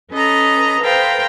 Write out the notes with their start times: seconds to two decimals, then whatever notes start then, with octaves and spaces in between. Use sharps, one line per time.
0.12 C#4 A4 B4 D#5 A#5
0.81 A4 B4 C5 F5 G5 A#5